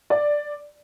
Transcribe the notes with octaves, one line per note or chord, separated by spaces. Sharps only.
D5